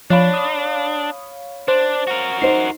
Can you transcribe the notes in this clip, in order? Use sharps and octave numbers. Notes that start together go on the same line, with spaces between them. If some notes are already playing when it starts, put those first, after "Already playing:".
F3 D4 C#5 F5 B5
D#6
D4 C5
F#4 A#4
D#4 C5 C7